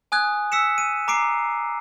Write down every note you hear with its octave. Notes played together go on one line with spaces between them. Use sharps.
G#5 D#6 F#6 G#6
E6 B6 C#7 E7
D#7
A#5 D6 C7 D7